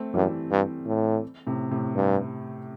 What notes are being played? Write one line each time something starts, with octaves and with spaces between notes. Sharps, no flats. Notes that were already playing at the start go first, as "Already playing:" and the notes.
Already playing: A3 C4
F#2 E3 G3
G2
A2
A2 C3
A2 C3
G2